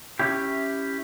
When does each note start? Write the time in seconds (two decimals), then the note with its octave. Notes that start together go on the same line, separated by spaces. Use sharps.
0.19 C#4 E4 G4